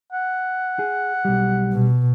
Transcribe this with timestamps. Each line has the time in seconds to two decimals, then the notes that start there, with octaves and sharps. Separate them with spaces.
0.13 F#5
0.79 G#4
1.25 B1 G3
1.73 B2